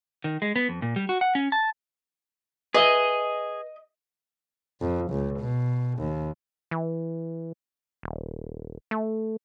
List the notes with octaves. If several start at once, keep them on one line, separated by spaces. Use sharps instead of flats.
D#3
G#3
B3
F2
A#2
G3
F#4
F#5
C#4
A5
G#4 B4 D#5 E5
F2
C#2
B2
D#2
E3
D#1
A3